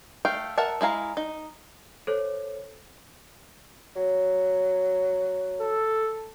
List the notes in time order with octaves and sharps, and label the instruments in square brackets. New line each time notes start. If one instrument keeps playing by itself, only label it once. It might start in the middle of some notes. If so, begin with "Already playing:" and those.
[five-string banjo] A3 F5 G5
A#4 E5 F#5 A5
G#3 E4 F5 A#5
D#4
[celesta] A4 C5 C#5
[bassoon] F#3
[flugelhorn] A4